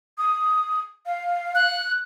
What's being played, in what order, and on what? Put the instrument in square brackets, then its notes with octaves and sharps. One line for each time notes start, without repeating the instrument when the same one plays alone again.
[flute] D#6
F5
[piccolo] F#6